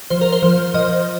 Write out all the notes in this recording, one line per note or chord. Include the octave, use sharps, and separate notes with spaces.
F3 C5
A#4
C5
F3
F3 D#5